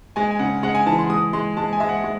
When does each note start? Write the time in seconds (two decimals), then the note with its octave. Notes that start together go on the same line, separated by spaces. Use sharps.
0.16 G#3 G#5
0.31 G#5
0.39 C#3 F#5
0.63 G#3 F#5
0.75 G#5
0.86 E3 A5
0.99 C6
1.10 G#3 D#6
1.33 G#3 C6
1.57 G#3 A5
1.73 G#5
1.80 G#3 E5
1.89 F#5
2.04 G#3